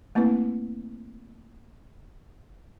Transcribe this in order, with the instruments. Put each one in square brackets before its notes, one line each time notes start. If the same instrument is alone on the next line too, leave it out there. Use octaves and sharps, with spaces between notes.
[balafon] A3 A#3 C4 E4 B4